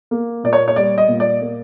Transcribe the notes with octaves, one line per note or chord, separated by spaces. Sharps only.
A#3
A#2 D5
C#5
C#5
G3 D5
D#5
A#2
D5
A#3